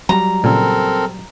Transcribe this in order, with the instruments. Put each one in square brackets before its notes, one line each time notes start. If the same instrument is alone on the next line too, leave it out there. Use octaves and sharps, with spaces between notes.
[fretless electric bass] F#3 G3 [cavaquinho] A#5
[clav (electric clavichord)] A#2 C#3 [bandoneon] C4 A4 A#4